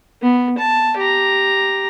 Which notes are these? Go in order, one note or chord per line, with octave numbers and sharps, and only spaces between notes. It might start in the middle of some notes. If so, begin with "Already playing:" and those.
B3
A5
G4 A#5